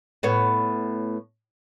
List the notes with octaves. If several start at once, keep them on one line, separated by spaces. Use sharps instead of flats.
A2 B3 C#5